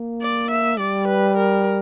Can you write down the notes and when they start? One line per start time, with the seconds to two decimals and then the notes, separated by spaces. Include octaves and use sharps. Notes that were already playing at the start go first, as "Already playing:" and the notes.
Already playing: A#3
0.21 D5
0.51 E5
0.79 G3 D5
1.08 B4
1.37 A#4